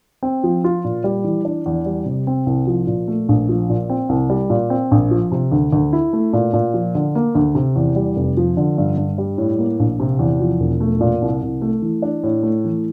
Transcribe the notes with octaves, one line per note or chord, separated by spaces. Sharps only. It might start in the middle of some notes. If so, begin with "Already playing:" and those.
C4
F3
F4
A#2
G3
E3
D4
E2
G3
C3
C4
C2
F3
A#2
A3
A#1
F3
A#2
C4
C2
G3
A#2
C4
A#1
F3
C3
D2
D2
E4
A3
A#2
A#2
F3
D3
A#3
D2
C3
E2
G3
F1
F3
D3
G2
G2
G3
A2
A#3
A#1
C3
E2
F3
E1
A3
A#2
C2
C2
A3
E3
D4
A2
A3
E3